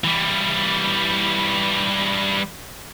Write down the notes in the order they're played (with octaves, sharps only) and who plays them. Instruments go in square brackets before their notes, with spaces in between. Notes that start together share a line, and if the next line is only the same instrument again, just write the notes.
[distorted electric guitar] E3 G3